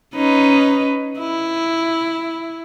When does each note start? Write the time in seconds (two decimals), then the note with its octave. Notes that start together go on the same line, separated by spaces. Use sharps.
0.15 C#4 D#4 B4
1.20 E4